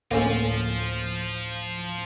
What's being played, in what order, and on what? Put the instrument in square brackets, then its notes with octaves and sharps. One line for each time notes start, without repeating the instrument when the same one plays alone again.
[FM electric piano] D2 A2 D3 [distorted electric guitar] F3 F4 [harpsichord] A#3 C#4 A4